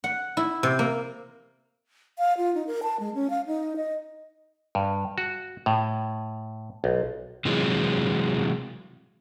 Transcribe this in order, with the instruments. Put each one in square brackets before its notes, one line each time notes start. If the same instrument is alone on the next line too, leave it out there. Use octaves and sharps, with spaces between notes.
[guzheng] F#5
E4
C3
A#3
[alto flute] F5
F4
D#4
A#4
A5
G#3
C#4
F5
D#4
D#5
[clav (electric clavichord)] G2
F#4
A2
B1
[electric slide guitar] C3 E3 F#3 G#3